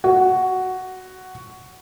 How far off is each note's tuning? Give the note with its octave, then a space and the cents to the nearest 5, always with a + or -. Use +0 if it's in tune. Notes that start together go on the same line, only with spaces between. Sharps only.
F#4 +5